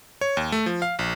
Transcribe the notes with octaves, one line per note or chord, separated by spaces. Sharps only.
C#5
D#2
A3
F3
F5
A#1